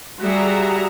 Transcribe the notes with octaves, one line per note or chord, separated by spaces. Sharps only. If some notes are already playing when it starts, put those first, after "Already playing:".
G3 F#4 G#4 E5 A#5